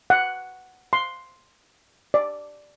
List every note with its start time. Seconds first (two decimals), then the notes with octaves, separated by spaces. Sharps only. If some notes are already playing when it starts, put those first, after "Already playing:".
0.10 F#5
0.93 C6
2.14 D5